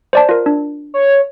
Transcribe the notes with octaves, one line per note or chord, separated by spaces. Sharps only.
C5 D5 A5
F4 A#4
D4
C#5